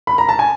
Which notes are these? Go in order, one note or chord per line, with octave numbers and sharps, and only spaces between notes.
B5
A#5
A5
G#5